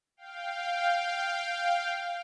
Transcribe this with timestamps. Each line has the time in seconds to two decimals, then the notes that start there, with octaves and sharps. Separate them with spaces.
0.17 F5 G5